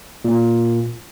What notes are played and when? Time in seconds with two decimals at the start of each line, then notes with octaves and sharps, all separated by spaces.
0.25 A#2